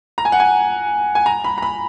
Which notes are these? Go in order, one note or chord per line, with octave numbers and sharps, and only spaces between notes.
A#5
G#5
F#5
G#5
G#5
A#5
B5
A#5
B5